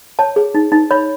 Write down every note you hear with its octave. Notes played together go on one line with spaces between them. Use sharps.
C#5 A5
G#4
D#4
D#4
C#5 B5